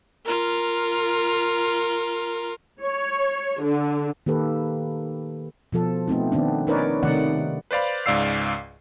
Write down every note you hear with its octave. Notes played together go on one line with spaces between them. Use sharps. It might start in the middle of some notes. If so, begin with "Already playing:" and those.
F4 A#4
C#5
D3
D#3 A#3 G4 A4 B4
B2 F3 A4
A3 B3 C4 D#4
D#3 B3 C4 D4
C#4 D#4 A#4 B4 C#5 D5
C3 D#3 A3 D#4 D5 F#5
B4 C5 D5 F5 B5
C#2 G#2 D5 F5 E6 C7